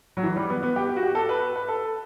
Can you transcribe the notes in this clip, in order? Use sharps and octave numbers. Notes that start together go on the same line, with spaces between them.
F#3
E3
G3
B3
B3
G4
G4
F#4
G4
A4
B4
B4
A4